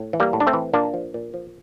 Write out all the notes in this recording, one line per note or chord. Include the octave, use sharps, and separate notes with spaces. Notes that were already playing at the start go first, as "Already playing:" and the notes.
Already playing: A2
E3
G3 A#3
A2
D4
A3 C4
E3
A#2 A#3 D4
F3
A#2
F3